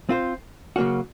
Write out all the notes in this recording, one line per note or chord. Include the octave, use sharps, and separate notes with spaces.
C4 F4 C5
C#3 F#3 A#3 C#4 F#4